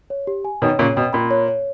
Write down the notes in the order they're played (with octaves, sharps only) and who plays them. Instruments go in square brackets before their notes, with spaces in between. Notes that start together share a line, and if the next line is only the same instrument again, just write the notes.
[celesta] C#5
G4
G#5
[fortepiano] B2 D#3 [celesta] C#5
[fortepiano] A#2 C#3 [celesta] C#5
[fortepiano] B2 [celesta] G5
[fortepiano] A#2 [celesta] B5
[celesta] C#5
C#5